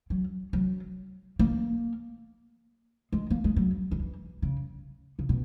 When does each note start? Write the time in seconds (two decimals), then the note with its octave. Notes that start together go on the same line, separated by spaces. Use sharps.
0.10 F#3
0.53 F#3
1.39 A#3
3.12 G#3
3.30 A#3
3.44 G#3
3.57 F#3
3.91 D#3
3.99 E3
4.42 C#3
5.19 C#3
5.29 B2